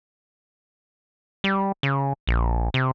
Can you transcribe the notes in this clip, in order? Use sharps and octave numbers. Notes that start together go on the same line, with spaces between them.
G3
C#3
A#1
C3